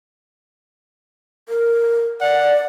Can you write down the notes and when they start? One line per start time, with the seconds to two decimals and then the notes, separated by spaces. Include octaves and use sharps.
1.49 A#4
2.21 D5 F#5